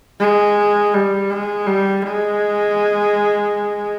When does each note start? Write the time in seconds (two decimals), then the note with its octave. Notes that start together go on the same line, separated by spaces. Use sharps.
0.20 G#3
0.94 G3
1.30 G#3
1.66 G3
2.02 G#3